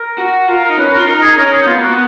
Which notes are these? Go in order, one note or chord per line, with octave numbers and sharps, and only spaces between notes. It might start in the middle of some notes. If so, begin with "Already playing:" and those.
Already playing: A#4
F#4
F4 A#4
A#4
D#4
C#4 B4
F4 A#4
D#4 A#4
G#4
C#4 A#4
G#4
D#4
B3 F4
A#3 F#4
B3